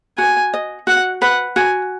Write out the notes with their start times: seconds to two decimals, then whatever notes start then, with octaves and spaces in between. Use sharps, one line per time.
0.18 F#4 G#5
0.54 D#5
0.87 F#4 F#5
1.22 B4 F#5
1.56 F#4 G#5